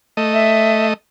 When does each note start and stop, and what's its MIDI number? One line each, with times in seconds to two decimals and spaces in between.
0.17 0.94 57
0.17 0.94 75
0.33 0.86 76